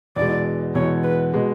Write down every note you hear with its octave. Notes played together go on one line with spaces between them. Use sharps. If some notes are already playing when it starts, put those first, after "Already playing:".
E2 B2 G#3 D5
E2 B2 G#3 C#5
B4
B2 G#3